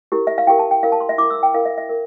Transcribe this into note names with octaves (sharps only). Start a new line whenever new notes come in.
E4 G4 A#4
E5
F5
E4 G4 A#4 G5
A5
G5
E4 A#4 F5
A5
C6
E5
E4 A#4 D6
E6
G5
E4 A#4 F5
E5
E5
A#4